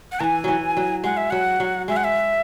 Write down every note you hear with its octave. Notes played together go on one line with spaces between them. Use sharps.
F#5
E3 G#5 A#5
E3 F#3
F#3
G#3 F#5
E5
F#3 F#5
F#3
G#3 E5
F#5
E5